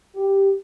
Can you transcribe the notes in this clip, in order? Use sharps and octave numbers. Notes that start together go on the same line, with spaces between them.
G4